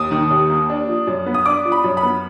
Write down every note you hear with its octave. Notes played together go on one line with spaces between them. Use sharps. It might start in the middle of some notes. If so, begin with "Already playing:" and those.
Already playing: D#2 D#6
D#3
D#2
A#3
D4
F3
F#2
B3
D#6
D4 D6
F3
B5
F#2
B5
B3